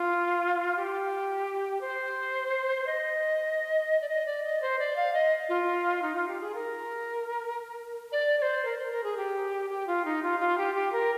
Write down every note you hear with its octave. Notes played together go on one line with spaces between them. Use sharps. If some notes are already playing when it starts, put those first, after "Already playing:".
Already playing: F4
G4
C5
D#5
D5
D#5
D5
D#5
C5
D5
F5
D#5
F4
D#4
F4
G4
G#4
A#4
D5
D5
C5
A#4
C5
A#4
G#4
G4
G4
F4
D#4
F4
F4
G4
G4
A#4